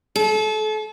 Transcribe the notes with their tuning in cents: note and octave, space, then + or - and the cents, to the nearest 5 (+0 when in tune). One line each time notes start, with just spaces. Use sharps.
A4 -35